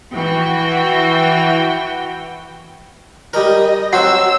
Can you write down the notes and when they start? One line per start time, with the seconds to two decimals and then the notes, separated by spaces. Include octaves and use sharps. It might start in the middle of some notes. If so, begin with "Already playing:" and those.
0.14 E3 F#4 G5
3.33 G3 A#4 D#5
3.93 F#3 C4 F#5 E6